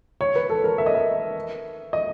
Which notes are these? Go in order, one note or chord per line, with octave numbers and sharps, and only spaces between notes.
C#5
B4
A4
A#4
E5
D#5
E5
D#5